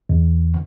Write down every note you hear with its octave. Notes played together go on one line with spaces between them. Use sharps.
E2